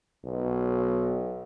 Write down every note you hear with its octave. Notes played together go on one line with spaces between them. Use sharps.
B1